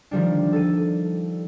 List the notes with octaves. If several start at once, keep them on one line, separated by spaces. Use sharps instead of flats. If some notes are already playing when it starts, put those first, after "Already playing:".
D#3 F3 G3 D4
A4 D#7